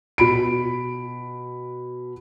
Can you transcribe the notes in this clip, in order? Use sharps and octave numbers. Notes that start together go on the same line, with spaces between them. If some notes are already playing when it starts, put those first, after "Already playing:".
B2 B5 D7